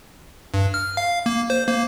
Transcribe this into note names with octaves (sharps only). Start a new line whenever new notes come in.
G2
F6
F5
A#3
C5
A#3